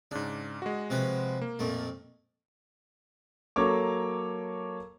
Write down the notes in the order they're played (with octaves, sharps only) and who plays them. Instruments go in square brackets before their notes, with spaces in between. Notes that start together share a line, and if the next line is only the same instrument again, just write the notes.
[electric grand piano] G#2 C#3 [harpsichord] D4
[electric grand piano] G#3 F#4
[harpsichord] C3 F3 B4
[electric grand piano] A#3
[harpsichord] F2 A#2 A3
[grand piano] F#3 A#3 A4 C#5 D6